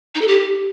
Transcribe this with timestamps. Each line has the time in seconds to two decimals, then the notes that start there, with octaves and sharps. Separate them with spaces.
0.15 D#4
0.21 A4
0.28 G4